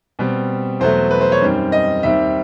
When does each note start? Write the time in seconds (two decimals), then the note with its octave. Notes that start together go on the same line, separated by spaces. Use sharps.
0.19 B2 G3 C4
0.80 E2 B2 F#3 A3 C5
1.11 B4
1.21 C5
1.32 C#5
1.41 F#2 D#3 G3 C4
1.72 D#5
2.03 D#2 D#3 G3 C4 E5